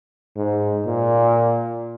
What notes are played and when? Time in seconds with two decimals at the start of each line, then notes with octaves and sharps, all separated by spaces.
0.36 G#2
0.86 A#2